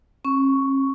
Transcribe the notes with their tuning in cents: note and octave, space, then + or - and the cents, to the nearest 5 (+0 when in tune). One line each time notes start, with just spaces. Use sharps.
C#4 -45 C#6 +5